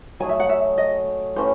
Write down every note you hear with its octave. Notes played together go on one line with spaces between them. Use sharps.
F#3 A3 D#4 G#4 G#5
E5
F#5
E5
D#5
A2 E3 A3 C#4 C5